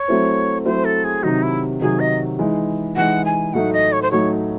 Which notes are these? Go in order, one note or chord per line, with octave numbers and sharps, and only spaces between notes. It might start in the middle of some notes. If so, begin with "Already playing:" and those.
Already playing: C#5
F#3 A3 C4 E4
F#3 A3 C4 E4 C5
A4
G#4
C3 D#3 F#3 D#4
E4
C3 D#3 F#3 G#4
D#5
E3 G#3 D#4
E3 G#3 D#4 F#5
G#5
A2 F#3 A3 D#4 F#5
D#5
C#5
C5
A2 F#3 A3 D#4 C#5